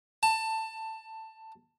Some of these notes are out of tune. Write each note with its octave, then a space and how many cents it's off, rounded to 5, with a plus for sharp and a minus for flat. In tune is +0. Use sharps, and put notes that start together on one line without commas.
A5 +15